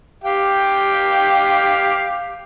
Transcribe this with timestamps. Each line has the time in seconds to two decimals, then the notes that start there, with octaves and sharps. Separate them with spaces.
0.24 G4 F5 G5